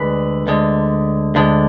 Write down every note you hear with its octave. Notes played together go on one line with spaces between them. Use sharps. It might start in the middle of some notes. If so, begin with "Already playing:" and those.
Already playing: D2 D3 G#3 B4
D2 D3 G#3
D2 D3 G#3